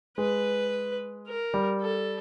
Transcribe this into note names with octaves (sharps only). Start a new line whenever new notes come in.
G#3 B4
A#4
G3
A4